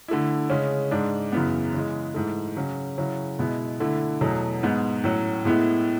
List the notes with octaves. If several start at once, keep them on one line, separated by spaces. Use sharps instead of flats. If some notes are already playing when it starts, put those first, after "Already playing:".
D3 A3 E4
C#3 G#3 C#4
G#2 G#3 D4
F#2 C#3 E3 B3
C#3 E3 G#3
G#2 E3 A3
C#3 F#3 C#4
C#3 F#3 C#4 E4
B2 G#3 B3 E4
D3 A3 E4
E2 B2 F#3 A3
G#2 G#3 B3
A2 F#3 C#4
A2 G#3 B3 E4